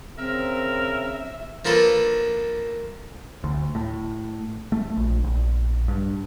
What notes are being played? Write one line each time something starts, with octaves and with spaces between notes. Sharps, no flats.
C#3 C4 A#4 E5
F3 A#3 D4 A4 B4
D2
A2
A3
A#1
A#1
G2